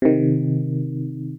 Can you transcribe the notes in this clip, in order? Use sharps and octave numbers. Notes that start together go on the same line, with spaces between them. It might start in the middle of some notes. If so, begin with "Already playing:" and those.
C3 D#3